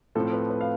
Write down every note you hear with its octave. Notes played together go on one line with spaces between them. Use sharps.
A2 F3 C4 A4
B4
B4
F5